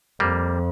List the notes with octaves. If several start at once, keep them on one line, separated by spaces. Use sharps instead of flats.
F2 G3 A#3